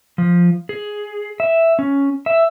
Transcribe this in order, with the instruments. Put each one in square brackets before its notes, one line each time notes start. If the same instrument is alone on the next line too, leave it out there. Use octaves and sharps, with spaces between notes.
[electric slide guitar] F3
G#4
E5
C#4
E5